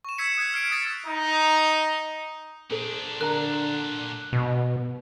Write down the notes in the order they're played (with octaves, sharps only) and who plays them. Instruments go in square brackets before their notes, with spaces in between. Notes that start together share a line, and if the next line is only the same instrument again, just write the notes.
[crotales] C#6 E7
E6 G#6 B6 C#7 E7
D#6 F#6 G#6 B6
F6 G#6 C7 D7
D#6 A6 B6
[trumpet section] D#4
[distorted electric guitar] A#2 D4 [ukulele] G#4 A4 C5
[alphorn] D3 [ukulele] A#4 A#5 [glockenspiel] F#6
[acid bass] B2